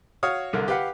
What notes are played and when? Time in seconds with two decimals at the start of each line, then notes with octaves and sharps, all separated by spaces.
0.23 F#4 C#5 F5 D#6 F6
0.53 C2 D3 A#4
0.68 G4 B4 F5 F#5